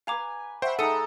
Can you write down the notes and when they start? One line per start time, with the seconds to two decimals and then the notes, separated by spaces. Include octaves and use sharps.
0.07 B4 F5 G#5 A#5 D6
0.62 C5 E5 F#5 G5 B5 C#6
0.79 G#3 D#4 A4 A#5 D#6 C#7 D#7